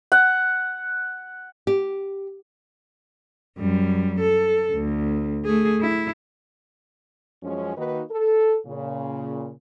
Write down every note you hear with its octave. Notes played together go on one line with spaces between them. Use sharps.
F#5
G4
F#2 G3
A4
D2
A3 G#4
E4
F#2 F3 G#3 C#4
D#3 A#3 D#4 F#4 B4
A4
A#2 C#3